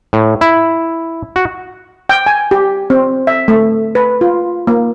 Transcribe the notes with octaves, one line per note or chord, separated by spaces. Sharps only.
A2
E4
F#4
G5
G#5
G4
C4
E5
A3
B4
F4
A#3